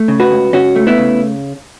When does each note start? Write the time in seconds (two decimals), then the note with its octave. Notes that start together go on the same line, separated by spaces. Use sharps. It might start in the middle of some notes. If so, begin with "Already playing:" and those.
Already playing: A3
0.08 C#3
0.20 F#4 B4
0.31 C#2
0.53 C#2 C#4 F#4
0.76 A3
0.87 B3 E4
0.98 C#3